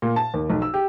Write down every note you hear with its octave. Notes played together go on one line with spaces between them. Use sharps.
A#2
A5
D#2
B1
E6
G4